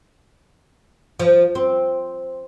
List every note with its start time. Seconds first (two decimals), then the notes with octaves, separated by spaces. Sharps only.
1.20 F3
1.55 C4